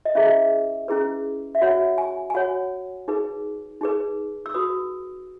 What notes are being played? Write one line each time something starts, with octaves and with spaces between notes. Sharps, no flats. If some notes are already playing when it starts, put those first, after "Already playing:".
D#5
C#4 E4 G#4 B4 E5
C#4 E4 G#4 B4
E5
F#4 C#5 F#5
G#5
G#5
F#4 C#5 F#5
D#4 G#4 B4
D#4 G#4 B4
E6
F#4 B4 D#6